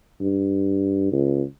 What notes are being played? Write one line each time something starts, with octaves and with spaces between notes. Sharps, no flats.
G2
C#2